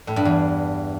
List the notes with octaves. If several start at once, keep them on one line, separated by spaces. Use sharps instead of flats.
A2
G2
E2